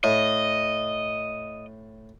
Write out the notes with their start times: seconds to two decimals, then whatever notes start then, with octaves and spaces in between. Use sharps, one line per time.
0.04 A2 D#5